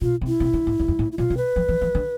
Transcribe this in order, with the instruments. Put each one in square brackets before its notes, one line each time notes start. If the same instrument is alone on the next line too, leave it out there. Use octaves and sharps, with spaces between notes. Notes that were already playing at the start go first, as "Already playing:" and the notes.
[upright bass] B2 [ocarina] F4
[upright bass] C3
[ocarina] E4
[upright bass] C3
D3
G#2
E2
F2
A2
[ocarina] E4
[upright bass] B2 [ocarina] F4
[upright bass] C3
[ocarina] B4
[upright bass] F3
E3
E3
D3